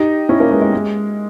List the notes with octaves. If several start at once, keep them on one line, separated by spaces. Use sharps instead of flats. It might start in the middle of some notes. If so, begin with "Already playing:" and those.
Already playing: D#4 G4
C#4 E4
A#3 C#4
G#3 B3
G#3
G#3